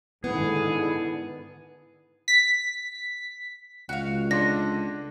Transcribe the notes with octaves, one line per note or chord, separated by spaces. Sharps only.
G#2 D3 D#3 B3 E4 G#4
B6
C#2 F#4 F5
D3 D4 C6 A#6